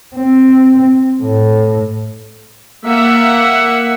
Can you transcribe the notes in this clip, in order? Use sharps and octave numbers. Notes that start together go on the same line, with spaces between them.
C4
A2
A#3 E5 F#5